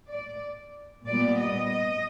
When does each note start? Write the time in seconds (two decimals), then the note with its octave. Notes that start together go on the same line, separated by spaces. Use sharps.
0.10 D5
1.08 A#2 G3 B3 D5
1.42 D#5